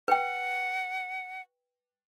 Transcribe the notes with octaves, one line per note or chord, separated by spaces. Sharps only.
B4 F#5 G5